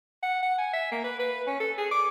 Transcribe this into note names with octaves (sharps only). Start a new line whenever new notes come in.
F#5
F#5
G#5
E5
A#3
B4
B4
C#4
A4
G#4
D6